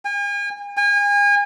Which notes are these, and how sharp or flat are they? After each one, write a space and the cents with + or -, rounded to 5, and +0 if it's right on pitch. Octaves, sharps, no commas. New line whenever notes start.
G#5 -40
G#5 -35